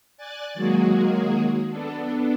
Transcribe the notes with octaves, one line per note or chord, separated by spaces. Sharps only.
D5 G#5 F#6 A6
D#3 F#3 G#3 A#3 F#4 G#4
B3 D4 A4